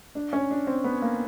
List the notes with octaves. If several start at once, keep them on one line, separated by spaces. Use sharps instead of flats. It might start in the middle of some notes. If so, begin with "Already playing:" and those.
D4
C#4
D4
C4
B3
A#3